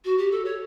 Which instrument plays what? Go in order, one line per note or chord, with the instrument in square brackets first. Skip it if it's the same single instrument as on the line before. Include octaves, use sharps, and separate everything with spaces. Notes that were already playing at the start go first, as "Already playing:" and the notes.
[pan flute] F#4
G4
A4
C#5